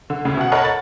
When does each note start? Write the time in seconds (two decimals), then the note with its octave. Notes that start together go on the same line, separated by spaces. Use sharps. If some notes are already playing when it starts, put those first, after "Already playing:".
0.10 D3
0.25 D2 A2 C#3
0.37 B2 F#5
0.52 A4 A#4 C#5 D#5 F#5 B5
0.65 A6